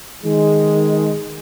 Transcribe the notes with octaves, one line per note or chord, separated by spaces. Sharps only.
D#3 G#3